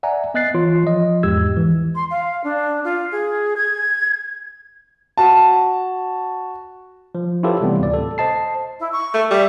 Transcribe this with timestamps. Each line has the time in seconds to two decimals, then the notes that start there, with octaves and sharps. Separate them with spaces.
0.03 D5 E5 F#5 G#5 A#5
0.34 B3 D#5 F#6 A6 C7
0.54 E3 F4 C#5 C6
0.84 F3 D#5
1.23 E2 G#2 G#3 G4 E6 G#6
1.57 E3
1.95 C6
2.10 F5
2.44 D4
2.84 F4
3.12 G#4
3.56 G#6
5.17 F#4 A5
7.15 F3
7.43 E4 F4 G4 A4 B4 C#5
7.61 C3 E3 G3 A3 B3 C4
7.79 D2 A2 D5
7.93 A4
8.18 C5 D#5 A5 C7
8.79 E4
8.92 C#6
9.14 A3
9.31 G3 E5